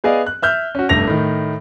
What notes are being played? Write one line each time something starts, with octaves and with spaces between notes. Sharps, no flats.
B3 G#4 D5 D#5 F5
F#6
E5 F6 G6
C#4 F#4
F1 G2 A3 A#6 F7
A2 D#3